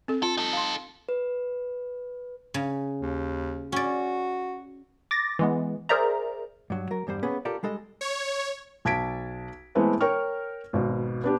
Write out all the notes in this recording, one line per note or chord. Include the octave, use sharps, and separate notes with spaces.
C4 A4
F4 A4
D#4 A4
F5 C6
B4
C#3
D#2
C#4 F#4 D5
D6 A6 A#6
E3 G#3 B3
G#4 A#4 C5 D5 E5 A#5
G2 F#3
F#3 A#4
E2 G2 G3 C5
A#3 B3 C#4 G#4 B4
F4 G4 A4 A#4 D5
G3 G#3 A4 D#5
C#5
B1 A5 G#6 B6 D7
E3 G#3 A3 B3 C4
A#4 C#5 G5 C#6 F6
G#1 B2
B3 D4 G4